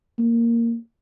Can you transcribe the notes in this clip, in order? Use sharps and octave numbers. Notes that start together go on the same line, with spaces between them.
A#3